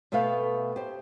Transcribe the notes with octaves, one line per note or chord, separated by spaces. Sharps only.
B2 A3 B3 E5 F5 G5
G4 C5